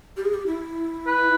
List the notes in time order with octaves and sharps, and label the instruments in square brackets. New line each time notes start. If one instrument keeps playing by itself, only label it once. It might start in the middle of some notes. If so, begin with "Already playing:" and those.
[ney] G4
G#4
G4
E4
[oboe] B4